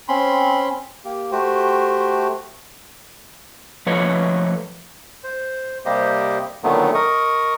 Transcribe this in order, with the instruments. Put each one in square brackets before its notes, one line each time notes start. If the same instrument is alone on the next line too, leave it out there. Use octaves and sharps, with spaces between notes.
[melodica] C4 C#4 B5 C6
A#3 G4
A3 F#4 G4 C5
[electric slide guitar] F3 A3 B4 C#5 D#5
[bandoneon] C5
C3 G3 A#3 G4 C5 D#5
A#2 D3 D#3 F#3 A3 B3
A#4 D#5 C#6 D#6